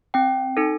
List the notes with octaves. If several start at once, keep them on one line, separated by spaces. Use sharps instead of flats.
C4 G5
D#4 A4